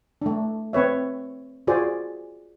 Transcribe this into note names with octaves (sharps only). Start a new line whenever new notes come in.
A3 D4
C4 B4 C#5 E5
F4 F#4 G#4 C5 D5